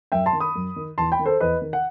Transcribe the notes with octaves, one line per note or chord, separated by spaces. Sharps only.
F#2 E5 G5
A5 C6
D#3
B5 D#6
F#2
D#3
E2 A5 C6
G5 B5
D#3
A4 C5
E2 B4 D#5
D#3
F#5